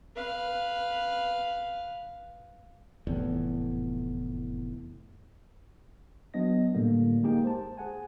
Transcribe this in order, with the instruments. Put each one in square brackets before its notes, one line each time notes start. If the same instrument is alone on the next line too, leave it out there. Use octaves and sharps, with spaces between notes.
[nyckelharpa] B4 F5
[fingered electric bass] F1 E2 A2
[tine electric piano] F#3 B3 D4 D#5 A#6
A2 D3 G3 A#3
G#3 A#3 D#4 G4 G#4 G5
C5 A5
G#4 F#5 G#5